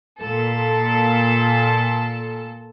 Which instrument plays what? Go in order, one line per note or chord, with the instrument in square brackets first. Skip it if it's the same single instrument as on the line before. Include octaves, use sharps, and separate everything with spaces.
[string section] A#2 A4